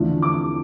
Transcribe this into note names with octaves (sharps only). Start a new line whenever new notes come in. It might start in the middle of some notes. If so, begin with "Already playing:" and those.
Already playing: E2 D3 F3 A3 D4
D6